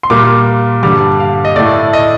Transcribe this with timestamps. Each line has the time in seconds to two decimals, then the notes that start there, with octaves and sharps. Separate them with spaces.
0.03 C6
0.10 A#2 G3 A#3 D6
0.83 G2 D3 G3 D6
1.20 F5
1.45 D#5
1.56 A2 A3 D5
1.93 D#5